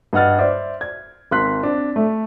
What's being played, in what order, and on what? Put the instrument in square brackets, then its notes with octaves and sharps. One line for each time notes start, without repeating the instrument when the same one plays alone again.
[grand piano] G2 D#5 F#5 F6 A6
C5 D5 E5
G#6
G#1 C6 F#6 B6
C4 D4
A3